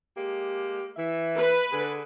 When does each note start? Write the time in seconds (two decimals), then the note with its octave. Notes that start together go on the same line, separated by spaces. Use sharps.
0.17 G#3 A#3 G4
0.97 E3 E5
1.38 B4
1.73 D3 G#4